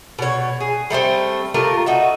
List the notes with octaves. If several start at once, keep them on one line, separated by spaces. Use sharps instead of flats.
B2 C#5
G#4
G3 A3 B3 C4
A3 F4 G4 A#4
D#4 F#4 E5